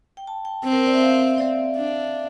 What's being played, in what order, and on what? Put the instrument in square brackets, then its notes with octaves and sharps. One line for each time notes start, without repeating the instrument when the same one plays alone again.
[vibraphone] G5
A5
G5
[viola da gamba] C4
[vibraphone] A#4
C5
D5
E5
F5
F5
E5
D5
[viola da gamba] D4